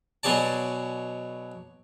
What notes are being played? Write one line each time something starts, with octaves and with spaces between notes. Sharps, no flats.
B2 F#3 G#4 D5 A5